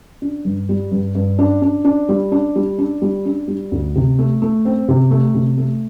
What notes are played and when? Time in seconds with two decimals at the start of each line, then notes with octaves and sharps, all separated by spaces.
0.22 D4
0.45 G2
0.69 G3
0.92 G2
1.15 G2
1.39 D4
1.62 D4
1.85 D4
2.09 G3
2.32 D4
2.56 G3
2.78 D4
3.02 G3
3.26 D4
3.48 G3
3.71 D2
3.96 C3
4.19 A3
4.42 A3
4.65 C4
4.88 C3
5.11 A3
5.34 C3
5.58 A3